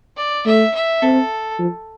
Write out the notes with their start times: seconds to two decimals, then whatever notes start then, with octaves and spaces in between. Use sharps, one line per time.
0.17 D5
0.46 A3 E5
0.75 E5
1.02 C4 A4
1.59 F3